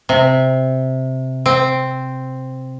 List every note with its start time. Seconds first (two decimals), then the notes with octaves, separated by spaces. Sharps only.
0.09 C3
1.46 C4